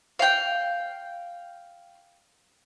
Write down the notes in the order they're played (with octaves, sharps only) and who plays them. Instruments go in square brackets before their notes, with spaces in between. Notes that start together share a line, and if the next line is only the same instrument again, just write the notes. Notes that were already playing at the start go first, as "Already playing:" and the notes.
[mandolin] F5 G5